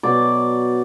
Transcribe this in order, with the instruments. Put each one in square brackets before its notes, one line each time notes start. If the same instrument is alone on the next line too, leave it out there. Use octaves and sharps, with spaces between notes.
[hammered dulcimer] B2 F#3 D5